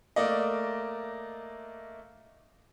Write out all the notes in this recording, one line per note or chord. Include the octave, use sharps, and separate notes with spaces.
A3 A#3 D5 D#5